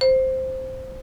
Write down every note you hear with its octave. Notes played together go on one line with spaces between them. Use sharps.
C5